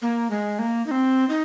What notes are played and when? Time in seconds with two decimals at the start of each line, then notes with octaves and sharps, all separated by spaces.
0.02 A#3
0.30 G#3
0.59 A#3
0.87 D#4
0.91 C4
1.29 D#4